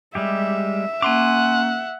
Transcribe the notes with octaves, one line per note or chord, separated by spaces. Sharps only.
G3 G#3 G4 E5
A#3 C#4 F#5 G#5 C6 D6